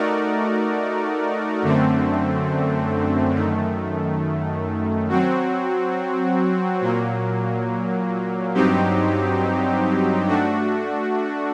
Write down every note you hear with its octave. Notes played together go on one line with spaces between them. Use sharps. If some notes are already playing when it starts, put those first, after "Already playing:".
Already playing: A3 D#4 F#4 A#4 D5
F#2 D3 A3 C4
F#2 D#3 A3
F#3 C4 F#4
A#2 F#3 A#3
G2 F#3 C4 D#4 G4
A3 D4 F#4